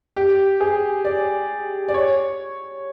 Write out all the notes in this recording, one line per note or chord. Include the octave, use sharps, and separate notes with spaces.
G4
G#4
D5
D5
C#5